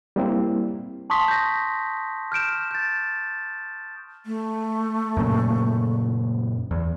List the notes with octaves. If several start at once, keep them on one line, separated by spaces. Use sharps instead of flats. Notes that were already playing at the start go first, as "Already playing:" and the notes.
G3 A#3 C4 E4
A5 C6 C#6 D#6 B6
G6 A#6
F6 G6 D7 E7
G6 A6
A3
F#2 A#2 C#3
E2